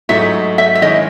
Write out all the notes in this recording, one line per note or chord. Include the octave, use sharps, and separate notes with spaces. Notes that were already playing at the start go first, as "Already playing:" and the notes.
G#2 F#3 A3 D#4 E5
E5
E5
D#3 G#3 C#4 E4 D#5